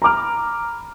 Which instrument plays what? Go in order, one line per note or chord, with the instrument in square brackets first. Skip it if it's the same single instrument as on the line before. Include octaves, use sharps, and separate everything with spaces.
[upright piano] A#5 B5 D6 F6